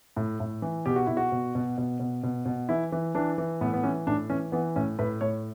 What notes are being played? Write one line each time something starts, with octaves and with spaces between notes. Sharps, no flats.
A2
A2
E3
B2 G4
F#4
B2 E4
F#4
B2
B2
B2
B2
B2
B2
E3 E4
E3
E3 D4
E3
A2 B3
B3
E3 C#4
A2 D4
E3 C#4
E3 B3
A2 C#4
A2 B4
A2 C#5